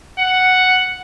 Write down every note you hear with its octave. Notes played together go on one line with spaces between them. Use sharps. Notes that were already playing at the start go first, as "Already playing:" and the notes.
F#5